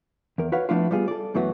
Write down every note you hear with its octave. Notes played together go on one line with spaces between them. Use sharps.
E2 A#4
F#4 B4 C#5 F5 F#5
F3 A3 B3 D4 E4 F4
G3 B3 F4 G#4
A4 D5
F#2 E3 F#3 A3 B3 F#4